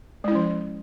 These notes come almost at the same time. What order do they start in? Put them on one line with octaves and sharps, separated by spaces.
G#3 E4 C#4 F3